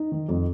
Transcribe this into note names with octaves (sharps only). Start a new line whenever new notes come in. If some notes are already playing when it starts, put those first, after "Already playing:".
Already playing: D#4
D#3
F2